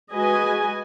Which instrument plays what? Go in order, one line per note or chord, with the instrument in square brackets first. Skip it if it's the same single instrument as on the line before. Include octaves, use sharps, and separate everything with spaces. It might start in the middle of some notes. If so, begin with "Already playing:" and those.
[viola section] G#3 F#4 B4 D#5 G#5